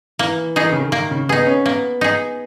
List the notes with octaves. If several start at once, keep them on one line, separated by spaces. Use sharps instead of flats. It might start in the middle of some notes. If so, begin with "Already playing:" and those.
E3 A#3
E3 D#4 G#4
D#3
C#3
D#3
D#3 A#3
C#3
B3 D#4 G#4
C#4
A#3 B3
D#4 G#4